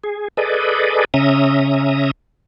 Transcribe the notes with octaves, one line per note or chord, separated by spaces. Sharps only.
G#4
G#4 A4 B4 D5 D#5
C#3 C#4 E5 A#5 D#6